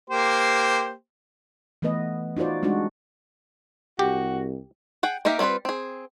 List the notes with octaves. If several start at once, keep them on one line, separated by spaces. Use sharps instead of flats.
A#3 G4 C5
E3 A3 B3 B4 D#5
D#4 F4 F#4 C5 D5
G3 G#3 C4 D4 D#4 F#4
C2 F#4 G4
G#4 F#5 G5
A#3 D#4 G4 A#4 E5
G3 C4 E4 F4 B4
C4 G#4